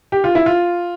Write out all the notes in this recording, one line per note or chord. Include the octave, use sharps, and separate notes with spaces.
G4
F4
E4
F4